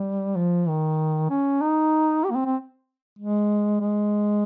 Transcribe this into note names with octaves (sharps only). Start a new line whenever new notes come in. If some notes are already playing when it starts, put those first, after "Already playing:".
Already playing: G3
F3
D#3
C#4
D#4
G4
A#3
C4
C4
G#3
G#3